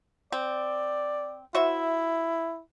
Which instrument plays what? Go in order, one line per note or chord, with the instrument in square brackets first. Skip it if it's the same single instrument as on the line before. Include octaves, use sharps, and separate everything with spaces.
[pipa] C4 [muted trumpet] D5
[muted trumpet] E4 [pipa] F#4 C5 E5